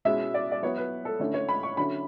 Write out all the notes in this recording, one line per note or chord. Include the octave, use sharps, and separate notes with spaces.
B2 G#3 C#4 E4 E5
D5
D5
F#3 B3 E4 C#5
B4
A4
D3 A3 C#4 E4
C#5
B5
C#6
D3 F#3 C#4 E4 B5